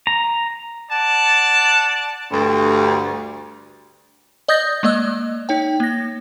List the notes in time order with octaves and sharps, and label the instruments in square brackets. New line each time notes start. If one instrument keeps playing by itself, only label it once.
[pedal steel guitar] A#5
[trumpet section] D5 F#5 A5
[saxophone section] D2 G2
[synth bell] D5 D#5 D#6 G6 A6 A#6
G#3 A#3 D5 D#5 E6 F#6
D#4 C#5 G5
A#3 A#6